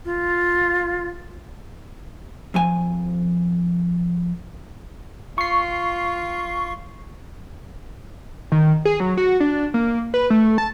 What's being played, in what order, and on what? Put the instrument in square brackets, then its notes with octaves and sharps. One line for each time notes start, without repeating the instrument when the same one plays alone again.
[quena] F4
[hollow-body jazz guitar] F2 F3 G#5
[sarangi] F4 [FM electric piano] C#6 C7
[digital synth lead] D#3
G#4
F#3
F#4
D4
A#3
B4
A3
A5